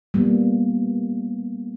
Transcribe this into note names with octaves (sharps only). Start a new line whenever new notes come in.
G3 A#3 B3